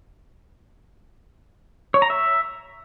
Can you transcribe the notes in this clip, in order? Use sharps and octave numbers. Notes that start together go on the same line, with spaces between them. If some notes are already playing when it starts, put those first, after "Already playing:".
C#5
A#5
E5